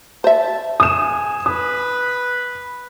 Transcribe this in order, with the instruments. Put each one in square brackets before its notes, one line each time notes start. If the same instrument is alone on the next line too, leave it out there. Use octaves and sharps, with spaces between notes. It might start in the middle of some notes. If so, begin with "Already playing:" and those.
[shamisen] C5 E5 [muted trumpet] A5
[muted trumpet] G#4 [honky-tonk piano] D#6 E7
[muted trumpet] B4 [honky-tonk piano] D#6